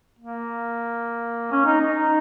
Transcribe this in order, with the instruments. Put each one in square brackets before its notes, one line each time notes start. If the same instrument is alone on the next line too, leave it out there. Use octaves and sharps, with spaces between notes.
[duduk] A#3
C#4
D#4
D#4